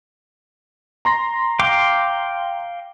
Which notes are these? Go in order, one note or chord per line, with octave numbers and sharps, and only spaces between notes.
A#5 C6 A#6
F5 G5 D6